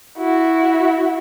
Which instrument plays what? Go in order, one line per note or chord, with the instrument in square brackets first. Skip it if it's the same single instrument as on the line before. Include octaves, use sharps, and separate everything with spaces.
[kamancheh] E4 F#4